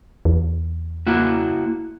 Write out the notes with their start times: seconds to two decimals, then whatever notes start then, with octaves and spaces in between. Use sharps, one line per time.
0.25 E2
1.07 A#3 E4 F#4